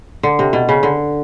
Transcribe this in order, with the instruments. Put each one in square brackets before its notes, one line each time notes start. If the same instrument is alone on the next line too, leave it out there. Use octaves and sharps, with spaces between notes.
[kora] D3
C3
B2
C#3
D3